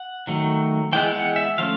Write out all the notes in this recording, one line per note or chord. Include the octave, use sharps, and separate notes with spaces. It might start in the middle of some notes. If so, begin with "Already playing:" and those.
Already playing: F#5
D#3 F#3 A3
E3 G#3 B3 G5
F#5
E5
F3 A3 C#4 F5